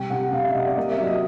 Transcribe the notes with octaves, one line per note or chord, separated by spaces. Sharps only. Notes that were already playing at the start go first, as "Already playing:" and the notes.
Already playing: C3 G3 G5
C3 F#5
C3 F5
E5
C3 D#5
D5
A#3 D#5
E5
F#3
D#5